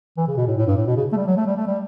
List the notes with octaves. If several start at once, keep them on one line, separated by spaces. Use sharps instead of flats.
E3
C#3
B2
A2
A2
G2
A2
B2
C#3
A3
G3
F#3
A3
G3
A3
G3